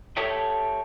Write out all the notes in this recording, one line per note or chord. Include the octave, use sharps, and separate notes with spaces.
G4 A4 C#5 E5 G5